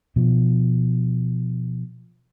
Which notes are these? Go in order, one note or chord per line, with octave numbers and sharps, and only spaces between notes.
B2 F3